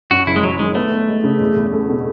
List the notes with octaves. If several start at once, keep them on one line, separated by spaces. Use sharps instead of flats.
F#2 F#4
F#1 E4
G#3
F#1 F#3
D#3 G#3
A3 B3
B3
G#3
C#3
E2
E2
A3
B2